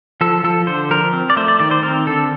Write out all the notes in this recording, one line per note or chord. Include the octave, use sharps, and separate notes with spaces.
F3 A4
F3 A4
D3 C5
F3 A#4
C4
D5
A3 C5
D5
D#3 D5
C5
C4 A#4
D3 A4